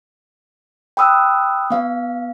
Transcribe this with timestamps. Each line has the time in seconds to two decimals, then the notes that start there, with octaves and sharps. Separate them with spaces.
0.97 G5 B5 D#6 E6 F#6
1.70 B3 F5